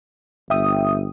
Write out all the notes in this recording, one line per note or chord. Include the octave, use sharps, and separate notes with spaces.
G1 E5 G5 D#6